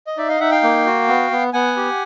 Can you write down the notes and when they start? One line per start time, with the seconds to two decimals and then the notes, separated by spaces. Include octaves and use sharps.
0.07 D#5
0.17 D#4 D5 E5
0.29 D#5 F5
0.40 D#4 E5 F#5
0.51 F5 G5
0.63 A#3
0.86 F#4
1.08 B3
1.31 B3
1.53 B3 F#5 G#5
1.77 G4